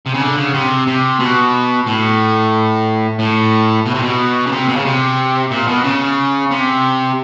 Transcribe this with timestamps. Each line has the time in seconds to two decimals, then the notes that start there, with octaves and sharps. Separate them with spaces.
0.06 C3
0.14 C#3
0.20 D3
0.37 C#3
0.54 C3
0.87 C3
1.19 B2
1.87 A2
3.19 A2
3.86 B2
3.94 C3
4.02 B2
4.46 C#3
4.52 C3
4.68 B2
4.76 C#3
4.85 C3
5.51 A#2
5.67 B2
5.84 C#3
6.51 C3